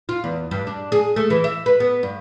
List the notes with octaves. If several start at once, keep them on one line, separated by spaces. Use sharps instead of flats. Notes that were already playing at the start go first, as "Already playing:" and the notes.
F4
E2
G2
D4
G#4
A3
E3
E5
B4
B3
G2